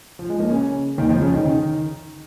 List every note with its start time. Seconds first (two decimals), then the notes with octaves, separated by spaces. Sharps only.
0.19 F3
0.29 G#3
0.40 A#3
0.50 C#3 C#4
0.98 D#2 D#3
1.09 F2 F3
1.21 C#3 C#4
1.33 D#3 D#4
1.45 D#3 D#4